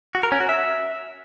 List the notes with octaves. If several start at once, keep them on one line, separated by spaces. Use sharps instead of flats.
F#4
A#4
C#4
F#4
E5